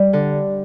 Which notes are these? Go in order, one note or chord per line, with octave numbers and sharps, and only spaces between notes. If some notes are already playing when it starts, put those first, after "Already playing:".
Already playing: G3 D5
D3